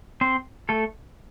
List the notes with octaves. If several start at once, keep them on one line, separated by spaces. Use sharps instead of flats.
C4 C5
A3 A4